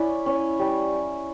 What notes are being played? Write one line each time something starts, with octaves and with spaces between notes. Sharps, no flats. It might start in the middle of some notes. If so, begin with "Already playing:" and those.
Already playing: C#4 E4 D5
C#4
G3